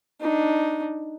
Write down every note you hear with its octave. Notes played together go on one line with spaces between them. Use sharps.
D4 D#4